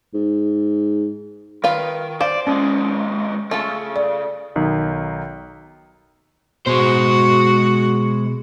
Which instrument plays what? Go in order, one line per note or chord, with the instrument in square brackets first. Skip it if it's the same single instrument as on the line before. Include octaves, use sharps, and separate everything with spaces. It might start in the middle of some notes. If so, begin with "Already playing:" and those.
[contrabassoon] G#2
[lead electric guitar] D#3 [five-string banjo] F4 B4 F5
[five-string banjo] C5 [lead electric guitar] D5 [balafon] F5
[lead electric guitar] D#2 G#3 [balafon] C#4
[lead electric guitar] C#3 [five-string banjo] A3 F4 A4
[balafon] D5
[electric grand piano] B1 D#3
[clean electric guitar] B2 [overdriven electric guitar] G#3 C5 [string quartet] F#4